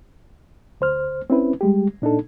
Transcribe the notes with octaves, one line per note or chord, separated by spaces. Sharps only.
D2 C5 F6
C4 C#4 E4 B4
G3 G#3 G4
A#2 D4 D#4 A4